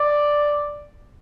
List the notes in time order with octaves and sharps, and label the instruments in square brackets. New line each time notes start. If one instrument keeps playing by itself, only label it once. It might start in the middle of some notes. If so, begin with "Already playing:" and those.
Already playing: [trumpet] D5